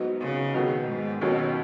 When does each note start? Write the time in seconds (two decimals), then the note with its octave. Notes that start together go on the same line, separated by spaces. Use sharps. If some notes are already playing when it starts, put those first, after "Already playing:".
Already playing: G#2 F#3 B3 D#4 F#4
0.20 C#3
0.54 B2 D#3 F#3 B3 G#4
0.88 G#2
1.21 D#2 B2 D#3 F#3 C#4